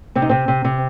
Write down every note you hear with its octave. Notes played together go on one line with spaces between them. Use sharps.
C3 C4
D#4
C3 C4
C3
C3